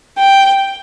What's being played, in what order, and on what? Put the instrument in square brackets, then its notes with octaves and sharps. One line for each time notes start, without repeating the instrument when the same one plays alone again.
[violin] G5